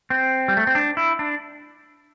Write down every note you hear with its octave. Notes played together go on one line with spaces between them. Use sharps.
C4
G3
A3
C4
D4
E4
D4